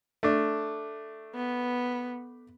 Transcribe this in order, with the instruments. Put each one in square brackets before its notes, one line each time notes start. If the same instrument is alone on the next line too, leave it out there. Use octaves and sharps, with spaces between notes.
[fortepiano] A3 D4
[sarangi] B3